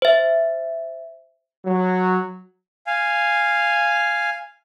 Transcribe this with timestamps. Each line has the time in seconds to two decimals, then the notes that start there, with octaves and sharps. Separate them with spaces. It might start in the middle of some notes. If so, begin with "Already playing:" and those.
0.02 C5 E5
1.65 F#3
2.87 F5 G#5